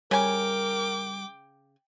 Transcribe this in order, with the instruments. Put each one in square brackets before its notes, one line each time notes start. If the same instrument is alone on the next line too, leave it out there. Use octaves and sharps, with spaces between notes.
[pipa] C#3 G#5 [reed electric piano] G3 [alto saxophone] A#4 [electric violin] G5 D6